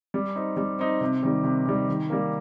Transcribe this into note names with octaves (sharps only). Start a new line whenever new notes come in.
G3
C4 D#4
G3
C4 D#4
C3
D#3 G3
C3
D#3 G3
D#3
G3 A#3